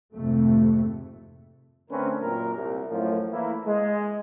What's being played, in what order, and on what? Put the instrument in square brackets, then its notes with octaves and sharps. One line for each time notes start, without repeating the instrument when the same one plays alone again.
[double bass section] G#1 F2 C3 A3
[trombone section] D3 A3 C4 C#4 A#4 B4
F#2 A#2 A#4
C2
F#2 A2 F3
E3 A3 A#3 E4
G#3